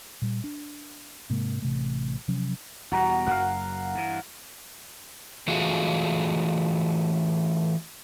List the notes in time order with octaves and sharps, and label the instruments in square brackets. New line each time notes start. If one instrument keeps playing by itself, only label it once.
[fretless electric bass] A#2 G3
D4
G#2 C3 G#3 A#3
A1 C3 A3
C3 F3 F#3 C#4
[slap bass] E2 B2 G3 [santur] F#4 A#5
[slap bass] F#1 F#2 A#3 [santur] F5 F#5
[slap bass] G2 E3
[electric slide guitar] E3 A3 F4 F#4 G#4